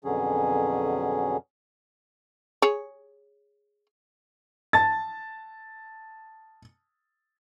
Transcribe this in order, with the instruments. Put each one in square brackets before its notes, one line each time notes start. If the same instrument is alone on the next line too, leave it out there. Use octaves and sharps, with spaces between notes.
[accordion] F2 B2 D3 F#3 C#4 G#4
[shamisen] G#4 C#5
[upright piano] A5 A6